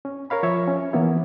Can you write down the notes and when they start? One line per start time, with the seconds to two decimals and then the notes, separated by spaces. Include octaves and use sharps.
0.05 C#4
0.30 A#4 C#5 F5 B5
0.43 F3 C#5 E5
0.68 C#4
0.93 E3 A#3 B3 E4